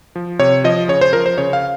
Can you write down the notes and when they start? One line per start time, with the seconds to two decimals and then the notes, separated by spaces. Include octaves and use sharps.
0.16 F3
0.39 C3 C#5
0.64 F3 D#5
0.88 C#3 C#5
1.01 C5
1.13 F3 A#4
1.26 C5
1.38 C#3 C#5
1.53 F5